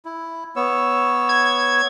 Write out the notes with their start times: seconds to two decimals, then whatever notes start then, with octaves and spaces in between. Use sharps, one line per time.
0.05 E4
0.56 B3 C#5 E6
1.29 G#6